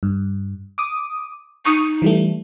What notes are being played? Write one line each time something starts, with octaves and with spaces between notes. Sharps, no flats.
G2
D6 D#6
D#4 C#6 D#6
E3 G3 A3